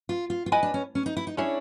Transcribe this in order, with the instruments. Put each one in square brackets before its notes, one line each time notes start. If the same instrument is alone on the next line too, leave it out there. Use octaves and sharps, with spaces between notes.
[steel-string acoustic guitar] F4
F4
F4
[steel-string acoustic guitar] E4 [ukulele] B4 D#5 G#5 B5
[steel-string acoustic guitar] D4
C#4
C#4
D#4
E4
D#4
[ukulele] C#4 E4 G#4 C#5 [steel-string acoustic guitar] D4